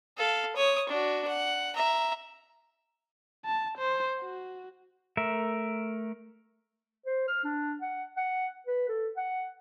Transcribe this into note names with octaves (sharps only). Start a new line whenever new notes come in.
A4 F5
C#5 D#6
D4 F#4
F#5
E5 A#5
A5
C5
F#4
A3 A#4 E5
C5
F6
D4
F#5
F#5
B4
A4
F#5